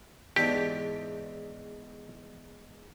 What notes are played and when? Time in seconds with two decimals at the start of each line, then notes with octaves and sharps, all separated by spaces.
0.36 E2 G#2 D4 G4